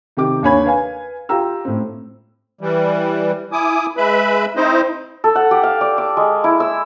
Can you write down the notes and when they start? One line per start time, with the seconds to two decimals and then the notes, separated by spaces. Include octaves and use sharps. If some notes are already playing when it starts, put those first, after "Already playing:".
0.17 C3 D#3 G4 D6
0.43 D#2 D4 C#5 G#5 B5 G#6
0.65 B4 F5 G#5
1.29 F4 G4 A#5 E6
1.65 A2 C4
2.61 E3 G3
3.52 E4 G#5 D6 D#6
3.97 G#3 B4 E5 B5
4.56 C4 D#4 E4 C5 D#5
5.24 A4
5.36 F#5
5.51 G4
5.63 F5
5.81 D5
5.98 D6
6.17 G#3
6.44 E4
6.60 E6